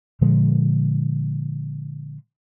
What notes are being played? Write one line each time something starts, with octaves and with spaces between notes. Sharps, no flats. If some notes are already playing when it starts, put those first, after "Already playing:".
A#2 D3 F3 G#3